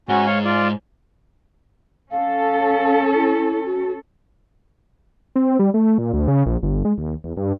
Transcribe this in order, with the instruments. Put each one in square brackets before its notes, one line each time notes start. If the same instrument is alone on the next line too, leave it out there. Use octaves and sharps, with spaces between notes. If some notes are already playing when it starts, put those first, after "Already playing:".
[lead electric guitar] G#2 [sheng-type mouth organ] C#4 F#4
[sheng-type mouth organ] C#5 F5
F4 D5
[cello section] C#4 A4 [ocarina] F5
[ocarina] E4
F#4
[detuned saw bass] C4
G3
A3
A#2
D2
C#3
A#1
G1
G#3
D#2
E2
G2